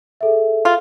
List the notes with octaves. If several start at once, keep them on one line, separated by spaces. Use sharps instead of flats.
G#4 A4 E5
F4